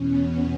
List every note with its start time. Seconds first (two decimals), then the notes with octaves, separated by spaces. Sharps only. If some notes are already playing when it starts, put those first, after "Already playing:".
Already playing: E2 B2 C#4
0.21 B3